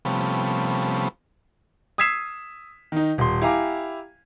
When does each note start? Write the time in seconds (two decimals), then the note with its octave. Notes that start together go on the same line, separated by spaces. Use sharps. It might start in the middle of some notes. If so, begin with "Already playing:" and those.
0.05 C3 F3 G3 A3 B3 C#4
1.98 D#6 E6 G#6 B6 C7 E7
2.92 D#3 D#4
3.18 D#1 C6
3.42 E4 G4 F5 G#5 A#5 D6